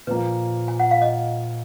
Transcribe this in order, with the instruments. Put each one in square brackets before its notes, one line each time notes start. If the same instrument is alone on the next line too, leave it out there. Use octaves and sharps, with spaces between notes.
[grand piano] A#2 F3 A#3 [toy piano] B4
[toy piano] G#5
F#5
F5
D#5